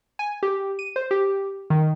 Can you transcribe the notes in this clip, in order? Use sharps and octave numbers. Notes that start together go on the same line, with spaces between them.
G#5
G4
D#7
C5
G4
D#3